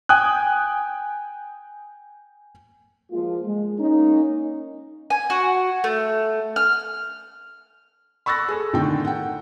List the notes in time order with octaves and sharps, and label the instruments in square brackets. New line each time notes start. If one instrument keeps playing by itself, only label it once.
[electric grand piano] G5 G#5 D#6 F#6
[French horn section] F3 G#3 A#3 F4
G#3
A#3 C#4 D#4
[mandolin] G#5
F#4
A3
F6
[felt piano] B5 C#6 E6 F#6 A6 A#6
G#4 A4
A2 D3 D#3 G5
F#5 G5